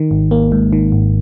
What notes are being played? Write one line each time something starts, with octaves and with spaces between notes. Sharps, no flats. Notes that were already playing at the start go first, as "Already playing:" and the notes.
Already playing: D#3
G#1
A#3
G#2
D#3
G#1